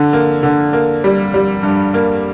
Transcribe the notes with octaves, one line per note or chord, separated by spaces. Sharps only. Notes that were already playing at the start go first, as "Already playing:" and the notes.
Already playing: D3
A#3
D3
A#3
G3
G3
G2
A#3